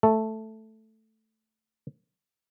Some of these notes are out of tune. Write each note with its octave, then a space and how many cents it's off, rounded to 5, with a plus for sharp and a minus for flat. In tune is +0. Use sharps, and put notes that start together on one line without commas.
A3 +0 A4 +0